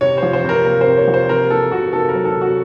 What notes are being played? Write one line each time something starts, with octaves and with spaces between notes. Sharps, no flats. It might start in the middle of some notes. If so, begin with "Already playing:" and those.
C3 C#5
F3 C5
C5
C3
A#4
A#3
C5
C3
C#5
F3
C5
C3 A#4
A#3 A4
C3 F#4
A#3 A4
A#4
F#3
A4
C3
F#4